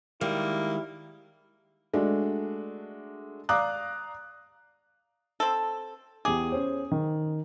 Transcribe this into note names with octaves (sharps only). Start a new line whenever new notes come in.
D#3 G3 G#3 A#3 E4
G#3 A3 D4 F#4
D5 F5 A#5 D6 D#6 F#6
C4 A4
E2 G4 G#4 D6
C#4 C5
D#3